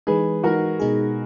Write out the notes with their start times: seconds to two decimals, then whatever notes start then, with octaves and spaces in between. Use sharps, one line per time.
0.07 E3 G#3 D#4 G#4 B4
0.44 E3 G#3 D#4 F#4 A#4
0.80 B2 G#3 D#4 G#4